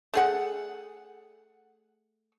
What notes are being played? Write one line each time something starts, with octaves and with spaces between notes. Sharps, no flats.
A3 G#4 F#5